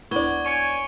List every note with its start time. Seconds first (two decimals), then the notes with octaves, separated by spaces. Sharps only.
0.11 D2 B3 E4 D5 C#6 G#6 G7
0.45 C#5 G#5 D7 D#7